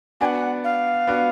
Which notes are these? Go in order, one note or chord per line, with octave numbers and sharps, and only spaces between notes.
B3 D4 F#4 F#5 G#5
F5
B3 D4 F#4